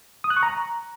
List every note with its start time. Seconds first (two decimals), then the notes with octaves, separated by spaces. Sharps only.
0.24 D#6
0.30 F#6
0.37 C#6
0.43 A#5